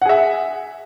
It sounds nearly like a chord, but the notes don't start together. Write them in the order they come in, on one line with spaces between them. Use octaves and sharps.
F#5 G#4 E5